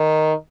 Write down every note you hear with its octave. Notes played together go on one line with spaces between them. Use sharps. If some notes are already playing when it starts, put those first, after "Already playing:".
Already playing: D#3